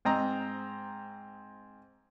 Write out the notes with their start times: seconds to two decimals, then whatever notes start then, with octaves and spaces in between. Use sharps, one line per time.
0.05 G#2 C4 D#5 A#5